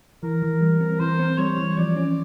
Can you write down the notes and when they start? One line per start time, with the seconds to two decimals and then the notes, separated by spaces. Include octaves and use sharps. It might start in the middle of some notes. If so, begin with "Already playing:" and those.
0.23 E3 A#4
0.43 E3
0.61 G3
0.81 C4
0.99 E3 C5
1.19 C4
1.38 G3 C#5
1.57 E3
1.77 F3 D5
1.96 C#4